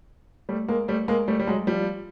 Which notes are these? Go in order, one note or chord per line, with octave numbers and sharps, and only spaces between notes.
G3 A3
G#3 A#3
G3 A3
G#3 A#3
G3 A3
G3
F#3 G#3
F3 G3